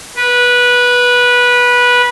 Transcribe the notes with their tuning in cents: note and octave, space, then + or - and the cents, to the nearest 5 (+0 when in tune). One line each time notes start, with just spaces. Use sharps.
B4 -15